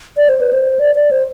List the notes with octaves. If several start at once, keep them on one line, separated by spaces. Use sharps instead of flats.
D5
C5
B4
C5
D5
D5
C5